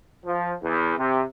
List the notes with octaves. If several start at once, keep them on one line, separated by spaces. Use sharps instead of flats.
F3
E2
C3